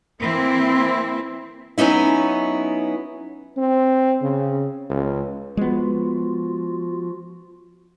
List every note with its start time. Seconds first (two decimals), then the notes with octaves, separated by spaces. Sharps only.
0.20 E3 A#3 C4 E4
1.78 F#3 B3 C#4 D#4 E4
3.57 C4
4.22 C#3
4.89 C#2
5.57 F3 G#3 B3 F4 F#4